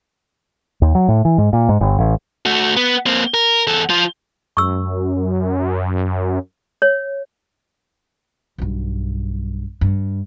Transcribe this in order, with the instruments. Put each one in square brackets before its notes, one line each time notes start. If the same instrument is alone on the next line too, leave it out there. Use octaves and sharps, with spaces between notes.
[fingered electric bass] D#2
F#3
A2
E3
G#2
A#2
G#2
G1
A1
[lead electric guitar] A3 F#4
B3
A#3 C4
A#4
E2 A4
F3 F4
[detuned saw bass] F#2 [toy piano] C#6 E6
[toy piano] C#5
[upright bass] B1 G2
G2